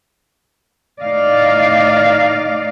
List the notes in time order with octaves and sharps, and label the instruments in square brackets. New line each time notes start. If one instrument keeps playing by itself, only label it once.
[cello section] A2 D#4 D5 D#5 F5